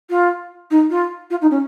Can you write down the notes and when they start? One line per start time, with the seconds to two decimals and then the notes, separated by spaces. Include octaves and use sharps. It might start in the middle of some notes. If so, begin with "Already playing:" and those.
0.09 F4
0.70 D#4
0.90 F4
1.30 F4
1.41 D#4
1.50 C#4